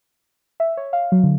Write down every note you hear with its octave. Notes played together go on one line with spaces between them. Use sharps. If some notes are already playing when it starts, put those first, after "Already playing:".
E5
C#5
F5
F#3
D3